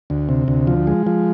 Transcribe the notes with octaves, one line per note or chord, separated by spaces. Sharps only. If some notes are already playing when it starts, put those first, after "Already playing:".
D2
C3
D2
F3
G#3
F3